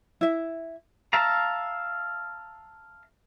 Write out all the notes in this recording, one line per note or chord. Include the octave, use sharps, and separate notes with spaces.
E4 E5
E5 F5 A5 A#5